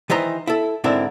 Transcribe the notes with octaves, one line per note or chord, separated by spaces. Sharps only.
D#3 E3 C5 D#5 A#5
E4 A4
G#2 D3 C4 D4 E4 A#4